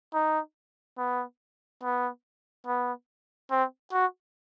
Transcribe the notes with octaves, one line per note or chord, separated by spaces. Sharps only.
D#4
B3
B3
B3
C4
F#4